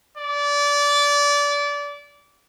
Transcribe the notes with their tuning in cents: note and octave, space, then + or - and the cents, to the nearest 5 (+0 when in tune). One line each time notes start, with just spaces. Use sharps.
D5 -25